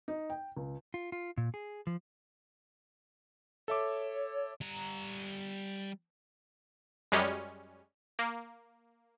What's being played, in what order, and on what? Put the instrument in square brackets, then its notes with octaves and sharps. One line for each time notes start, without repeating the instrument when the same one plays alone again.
[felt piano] D#4
G5
C#2
[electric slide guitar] F4
F4
A#2
G#4
F3
[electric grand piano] A4 E5 D6 [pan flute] C#5
[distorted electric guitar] G3 A#5
[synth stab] F#2 G3 G#3 C#4
A#3